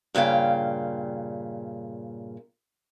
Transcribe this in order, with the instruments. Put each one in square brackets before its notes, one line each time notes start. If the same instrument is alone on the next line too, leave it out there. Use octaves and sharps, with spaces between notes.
[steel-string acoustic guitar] G2 A#2 C#3 F5 G5